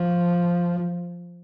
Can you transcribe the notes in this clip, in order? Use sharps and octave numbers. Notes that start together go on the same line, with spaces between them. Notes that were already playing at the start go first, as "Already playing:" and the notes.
Already playing: F3